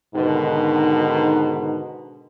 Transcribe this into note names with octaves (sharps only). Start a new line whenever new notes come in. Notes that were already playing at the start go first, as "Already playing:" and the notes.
G#2 B2 D3 D#3